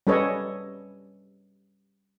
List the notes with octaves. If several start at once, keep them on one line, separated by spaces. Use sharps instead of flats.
G3 C#4 A4 B4 C#5 D#5